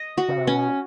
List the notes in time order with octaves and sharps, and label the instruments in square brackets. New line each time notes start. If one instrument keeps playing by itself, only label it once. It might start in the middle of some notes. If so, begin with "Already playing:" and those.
Already playing: [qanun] D#5
F#4
[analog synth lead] C#3
C3
[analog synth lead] B2 [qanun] C#4